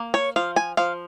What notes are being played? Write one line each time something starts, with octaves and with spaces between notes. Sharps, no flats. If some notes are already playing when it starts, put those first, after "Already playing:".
Already playing: A#3
C#5
F3 F5
G#5
F3 F5